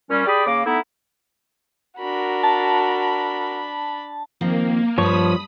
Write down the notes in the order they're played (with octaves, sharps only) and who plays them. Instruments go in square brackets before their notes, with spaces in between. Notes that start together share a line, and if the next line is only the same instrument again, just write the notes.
[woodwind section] A#2 G3 C#4
G4 G#4 D5 B5 D#6
C#3 A#3 D6
A3 B3 D#4 E4
[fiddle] D4 B5 [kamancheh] F#4 A#4
[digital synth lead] A5
[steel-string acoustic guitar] D#3 F3 C4 [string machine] A#3
[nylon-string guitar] G2 [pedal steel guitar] F3 C#5 C#6 [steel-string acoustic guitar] A5 [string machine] B5 D#6 B6